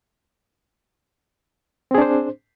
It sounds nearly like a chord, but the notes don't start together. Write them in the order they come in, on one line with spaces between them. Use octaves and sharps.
C4 G#4 D4 C5